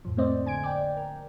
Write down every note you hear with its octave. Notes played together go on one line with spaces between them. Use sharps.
F2 A2 F3
A3 A#3 C4 C5 D5 D#5
D3 G#5 G#6 D7
D5 G5
A#4